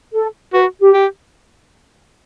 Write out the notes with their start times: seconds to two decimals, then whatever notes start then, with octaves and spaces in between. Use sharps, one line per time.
0.13 A4
0.53 F#4 B4
0.81 G4
0.94 G4